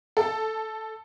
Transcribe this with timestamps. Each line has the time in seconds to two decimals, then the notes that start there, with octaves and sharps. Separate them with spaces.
0.17 A4